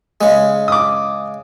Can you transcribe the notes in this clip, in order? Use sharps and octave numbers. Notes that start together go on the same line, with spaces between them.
C#3 G#3
D6 D#6